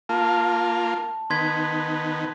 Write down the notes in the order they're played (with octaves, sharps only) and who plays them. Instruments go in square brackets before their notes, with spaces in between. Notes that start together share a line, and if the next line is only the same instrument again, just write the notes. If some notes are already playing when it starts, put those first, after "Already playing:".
[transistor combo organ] A#3 F4 [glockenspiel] A5
[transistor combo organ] D#3 B3 [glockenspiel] C6 G#6 B6